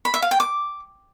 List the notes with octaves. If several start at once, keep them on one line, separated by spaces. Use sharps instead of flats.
B5
E5
F5
G5
D6